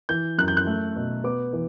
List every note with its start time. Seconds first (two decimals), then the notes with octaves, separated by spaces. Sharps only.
0.09 E3 G6
0.38 F#2 F#6
0.48 G6
0.57 F#6
0.67 A3
0.96 B2
1.24 B3 D6
1.53 E3